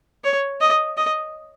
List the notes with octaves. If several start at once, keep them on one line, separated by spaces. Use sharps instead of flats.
C#5
D#5
D#5